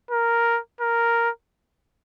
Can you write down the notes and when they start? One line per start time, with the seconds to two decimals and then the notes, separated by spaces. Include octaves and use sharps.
0.11 A#4
0.81 A#4